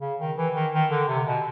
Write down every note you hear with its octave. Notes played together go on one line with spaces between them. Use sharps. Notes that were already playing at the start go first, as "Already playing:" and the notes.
C#3
D#3
E3
D#3
D#3
D3
C3
B2